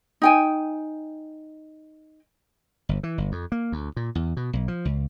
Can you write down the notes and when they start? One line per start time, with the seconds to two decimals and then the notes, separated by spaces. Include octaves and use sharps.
0.22 D#4 G5 G#5
2.89 G1
3.03 E3
3.18 G1
3.32 F2
3.52 A#3
3.72 D2
3.96 A#2
4.15 E2
4.37 B2
4.53 B1
4.68 F3
4.85 C#2